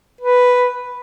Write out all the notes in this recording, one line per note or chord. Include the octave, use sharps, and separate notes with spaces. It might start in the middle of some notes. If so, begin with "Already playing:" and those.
B4